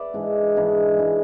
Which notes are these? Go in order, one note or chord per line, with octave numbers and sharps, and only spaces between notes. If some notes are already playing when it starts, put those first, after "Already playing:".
Already playing: B4 D5 E5
G#2 E3 G#3 D4
G#2 E3 G#3 D4
E3 G#3 D4